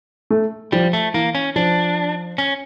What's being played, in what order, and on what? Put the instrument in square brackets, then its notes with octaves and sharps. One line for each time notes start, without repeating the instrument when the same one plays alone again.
[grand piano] A3
[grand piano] F3 [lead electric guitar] G3
[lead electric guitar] A3
[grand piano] E3 [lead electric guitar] A#3
[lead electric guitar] C#4
[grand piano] F3 [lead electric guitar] D4
[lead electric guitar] C#4